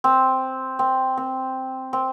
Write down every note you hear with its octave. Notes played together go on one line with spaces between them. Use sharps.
C4
C4
C4
C4